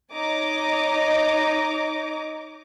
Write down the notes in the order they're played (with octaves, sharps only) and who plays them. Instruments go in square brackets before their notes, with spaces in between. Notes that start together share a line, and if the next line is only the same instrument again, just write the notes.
[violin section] D#4 C#5 D#5 A#5 D6